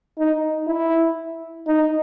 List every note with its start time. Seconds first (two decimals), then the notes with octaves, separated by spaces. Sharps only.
0.18 D#4
0.67 E4
1.67 D#4